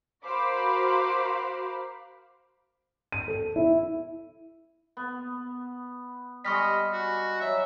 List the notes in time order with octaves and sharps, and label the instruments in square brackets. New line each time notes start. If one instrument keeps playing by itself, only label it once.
[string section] F#4 A#4 C5 F5 B5 D6
[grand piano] D#7
A4
E4
[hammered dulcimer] B3
[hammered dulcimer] G3 G#3 G#4 [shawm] D#5 [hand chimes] C#6 F6 B6
[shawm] F#4
[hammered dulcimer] F#3 [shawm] E5